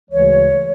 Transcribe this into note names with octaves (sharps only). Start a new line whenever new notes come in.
D2 C#3 E3 G#3 C#5